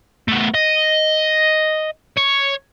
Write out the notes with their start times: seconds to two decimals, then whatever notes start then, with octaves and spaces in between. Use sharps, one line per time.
0.28 A3 B3
0.54 D#5
2.17 C#5